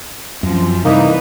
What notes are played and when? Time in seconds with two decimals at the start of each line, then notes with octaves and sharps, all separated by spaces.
0.43 F#2 F3 C4
0.85 C3 E3 G3 A#3 D#4 B4